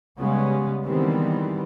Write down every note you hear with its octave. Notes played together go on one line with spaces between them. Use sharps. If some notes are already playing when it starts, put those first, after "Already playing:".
C#3 G3 G#3 B3 C#4
D#3 E3 G3 G#3 B3 C4